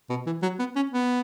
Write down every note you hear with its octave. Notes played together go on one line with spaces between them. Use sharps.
B2
E3
F#3
B3
C#4
B3